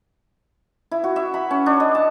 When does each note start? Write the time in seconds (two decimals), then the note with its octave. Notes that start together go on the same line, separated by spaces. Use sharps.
0.91 E4
1.04 F#4
1.16 E5
1.34 B5
1.51 C#4
1.66 D4
1.80 D#5
1.95 A5